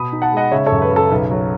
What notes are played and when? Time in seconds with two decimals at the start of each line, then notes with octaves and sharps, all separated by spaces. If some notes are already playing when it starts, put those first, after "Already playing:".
Already playing: B2 B5 D#6
0.13 D#4
0.22 F#5 A5
0.33 G#3 D#5 F#5
0.51 C#3 C#5 E5
0.66 A4 C#5
0.72 F#2
0.82 B4
0.91 C#3
0.96 A4
1.11 B1 B4
1.31 F#3